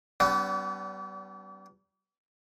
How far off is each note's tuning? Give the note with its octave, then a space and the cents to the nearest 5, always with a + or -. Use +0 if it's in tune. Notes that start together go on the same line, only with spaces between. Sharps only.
G3 -35 B3 +10 D4 -45